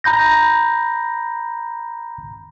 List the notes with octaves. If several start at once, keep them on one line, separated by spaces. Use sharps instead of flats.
A#5 B5 G6 A#6